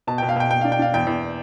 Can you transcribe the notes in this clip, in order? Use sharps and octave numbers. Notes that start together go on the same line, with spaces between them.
B2 A5
B2 G5
F5
B2 G5
B2 G5
D4 F5
G5
D4 F5
E2 G5
E2